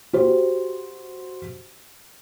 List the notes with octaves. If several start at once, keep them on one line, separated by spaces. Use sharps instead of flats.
F#4 G4 C5